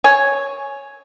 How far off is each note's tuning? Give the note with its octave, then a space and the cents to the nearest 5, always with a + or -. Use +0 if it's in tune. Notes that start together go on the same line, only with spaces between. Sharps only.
C#5 +0 G#5 +10